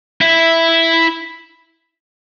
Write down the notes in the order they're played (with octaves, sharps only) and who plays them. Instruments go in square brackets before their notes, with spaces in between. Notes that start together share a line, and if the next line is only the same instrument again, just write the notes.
[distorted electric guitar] E4